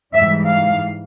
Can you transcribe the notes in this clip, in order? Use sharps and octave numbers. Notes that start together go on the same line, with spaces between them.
G#2 E3 G3 E5
F5